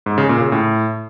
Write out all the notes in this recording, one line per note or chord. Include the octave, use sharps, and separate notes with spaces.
G#2
C#3
A#2
C#3
A2